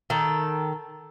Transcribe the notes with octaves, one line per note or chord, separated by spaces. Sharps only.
D#3 A4